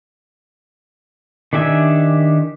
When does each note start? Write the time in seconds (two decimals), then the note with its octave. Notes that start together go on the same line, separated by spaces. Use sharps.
1.53 D#3 D4 G4 E5 G#5